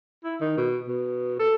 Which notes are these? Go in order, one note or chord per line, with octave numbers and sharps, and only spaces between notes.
E4
D#3
B2
B2
A4